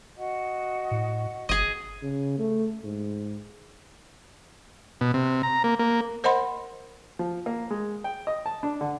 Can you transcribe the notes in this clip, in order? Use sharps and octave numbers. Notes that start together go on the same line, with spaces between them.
F#4 D#5 F#5
A2
G1 G#4 D#5
C#3
A3
G#2
B2
C3
A#5
A#3
A#3
A#4 C5 D#5 F#5 B5 C6
F3
A#3
G#3
G5
D#5
A5
D4
D3